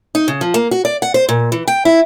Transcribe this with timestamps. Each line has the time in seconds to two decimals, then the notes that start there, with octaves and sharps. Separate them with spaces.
0.15 D#4
0.28 C#3
0.41 F3
0.54 A#3
0.71 F#4
0.85 D5
1.02 F#5
1.14 C5
1.29 A#2
1.52 E3
1.68 G5
1.85 E4